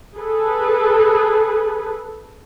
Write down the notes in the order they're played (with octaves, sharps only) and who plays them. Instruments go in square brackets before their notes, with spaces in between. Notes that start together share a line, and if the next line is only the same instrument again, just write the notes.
[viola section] G#4 A4 B4